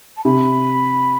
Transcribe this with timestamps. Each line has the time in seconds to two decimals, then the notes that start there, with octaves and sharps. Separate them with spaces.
0.17 A5
0.25 C3 B5